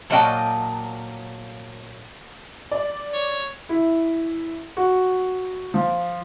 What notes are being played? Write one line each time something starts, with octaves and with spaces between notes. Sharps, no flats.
A#2 F#3 A#3 D#5 G5 A5
D5
C#5
E4
F#4
F3